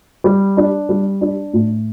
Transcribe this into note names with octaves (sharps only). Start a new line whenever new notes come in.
G3
D4
G3
D4
A2